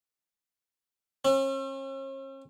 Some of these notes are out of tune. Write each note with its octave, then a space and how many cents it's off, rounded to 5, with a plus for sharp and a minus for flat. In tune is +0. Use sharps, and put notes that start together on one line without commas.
C#4 -45